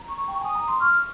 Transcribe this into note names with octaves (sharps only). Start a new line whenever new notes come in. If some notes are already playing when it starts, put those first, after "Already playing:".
Already playing: A#5
C#6
G5
G#5 D#6
A#5
C6
C#6 F6